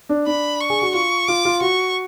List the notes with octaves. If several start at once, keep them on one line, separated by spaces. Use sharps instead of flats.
D4
D4 B5
C#6
G#4
F#4
F4 C#6
F4 D6
F4
F#4 C#6